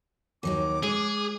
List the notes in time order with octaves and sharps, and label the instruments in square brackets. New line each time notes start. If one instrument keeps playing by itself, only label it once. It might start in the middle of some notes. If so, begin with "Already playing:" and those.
[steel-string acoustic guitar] D#2 F#3 D#4 [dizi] D6
[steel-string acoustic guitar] G#3 [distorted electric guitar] G#4